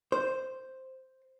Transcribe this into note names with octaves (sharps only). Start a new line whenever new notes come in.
C5